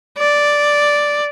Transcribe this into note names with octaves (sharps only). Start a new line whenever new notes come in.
D5